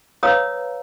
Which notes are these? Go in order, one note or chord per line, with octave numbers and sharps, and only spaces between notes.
B4 C#5 F5 A#5 D#6 E6